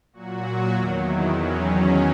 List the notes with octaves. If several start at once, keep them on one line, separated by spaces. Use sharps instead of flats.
A#2 F#3 F#4
E2 D#3 F#3
E4
E2 D#3 F#3 C#4